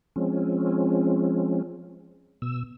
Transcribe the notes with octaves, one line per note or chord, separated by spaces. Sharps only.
F3 G#3 C4 C#4
B2 E6